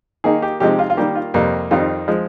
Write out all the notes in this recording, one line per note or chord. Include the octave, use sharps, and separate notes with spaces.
D#3 A#3 D#4 G#4
G4
C3 F3 G#3 C4 D#4 G4
F4
F4
D#3 G3 A#3 G4
F4
F2 C3 G3 A#3
F2 D#3 G3 C4 D#4 F4
F3 G#3